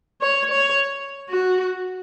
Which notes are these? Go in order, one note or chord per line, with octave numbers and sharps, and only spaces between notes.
C#5
C#5
F#4